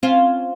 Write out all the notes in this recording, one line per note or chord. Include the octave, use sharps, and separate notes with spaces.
C4 C#4 F4